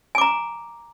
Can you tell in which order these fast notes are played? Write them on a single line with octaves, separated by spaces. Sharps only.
G#5 D6 A#5